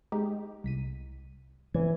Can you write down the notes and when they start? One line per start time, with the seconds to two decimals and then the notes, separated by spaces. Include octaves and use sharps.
0.12 G#3 D#4 G4
0.64 C2 B6 D#7
1.74 E3 G#6